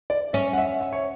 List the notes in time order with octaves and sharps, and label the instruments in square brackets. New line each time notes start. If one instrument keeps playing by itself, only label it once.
[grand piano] D5
[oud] C#4 [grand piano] E5
[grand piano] F#5
E5
E5
C#5